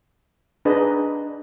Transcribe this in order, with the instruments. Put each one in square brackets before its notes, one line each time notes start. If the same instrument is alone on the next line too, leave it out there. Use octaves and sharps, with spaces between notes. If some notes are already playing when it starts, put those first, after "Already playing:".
[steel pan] D4 D#4 G#4 B4 D#5